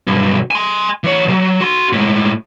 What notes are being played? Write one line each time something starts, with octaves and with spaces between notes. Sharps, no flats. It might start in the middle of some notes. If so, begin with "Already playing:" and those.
B1 G2
G#5 C6
E3 C#5
B1 F#3
F#4 C6
A2 G#3